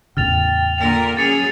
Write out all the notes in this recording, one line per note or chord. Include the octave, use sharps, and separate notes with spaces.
E2 A2 C#3 G5 F6 A6 F7
A#2 D3 A#4 F7
F#3 C#4 G#4 A6 C#7 F7